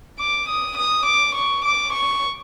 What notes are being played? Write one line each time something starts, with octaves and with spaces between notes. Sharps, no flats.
D6
D#6
D#6
D6
C#6
D6
C#6